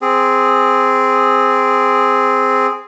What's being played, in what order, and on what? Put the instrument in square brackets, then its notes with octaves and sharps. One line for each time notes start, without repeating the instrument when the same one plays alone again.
[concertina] C4 G#4